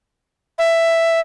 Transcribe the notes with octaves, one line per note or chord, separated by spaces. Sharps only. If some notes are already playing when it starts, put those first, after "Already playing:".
E5